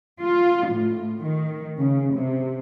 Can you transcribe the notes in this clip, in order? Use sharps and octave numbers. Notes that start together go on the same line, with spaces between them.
F4
A2
D#3
C#3
C3